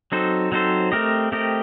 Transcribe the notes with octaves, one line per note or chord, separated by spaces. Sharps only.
F#3 C4 D#4 A4 C5
F#3 C4 D#4 A4 C5
A3 C4 G4 A#4 D#5
A3 C4 G4 A#4 D#5